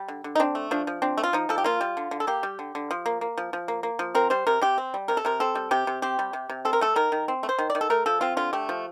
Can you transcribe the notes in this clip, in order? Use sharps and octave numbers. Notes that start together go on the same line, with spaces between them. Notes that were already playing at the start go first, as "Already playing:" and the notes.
Already playing: G3
D3
D3
D#4
C4 D4
A3
F3 D4
F3
C4 D4
A3
F4
F3 D#4
F3 A4
G4
A#3 F4
G3
D3
D3
A4
A#3 G4
G3
D3
D3
F3
A#3
A#3
F3
F3
A#3
A#3
F3
C4 A#4
G3 C5
C3 A#4
C3 G4
C4
G3
C3 A#4
A4
C3 A#4
C4 A4
G3
C3 G4
C3
C4 G4
G3
C3
C3
C4 A4
A#4
A3 A4
D#3 A#4
D#3
C4
A3
C5
D#3
D5
D#3
A4
A3 A#4
F3 A4
C4 F4
D3 F4
A3 G4
F3